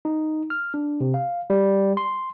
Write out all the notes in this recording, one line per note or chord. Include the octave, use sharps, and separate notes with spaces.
D#4
F6
D4
C3
F5
G3
C6